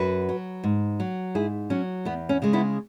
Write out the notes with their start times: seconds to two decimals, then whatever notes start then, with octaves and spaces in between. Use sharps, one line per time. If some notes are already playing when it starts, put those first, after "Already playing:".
Already playing: F#2 F#4 B4
0.29 F#3
0.64 G#2
1.00 F#3
1.35 G#2 E4 G#4
1.70 F#3 C#4
2.05 E2 B3
2.29 C#4
2.42 C#3 G#3
2.53 B3 E4